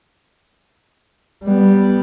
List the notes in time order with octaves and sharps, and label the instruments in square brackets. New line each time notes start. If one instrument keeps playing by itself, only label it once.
[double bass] G3 B3